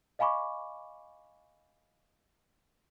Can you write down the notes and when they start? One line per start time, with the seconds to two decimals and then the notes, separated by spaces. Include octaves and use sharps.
0.19 D#5 F5 G#5 B5 C#6 D6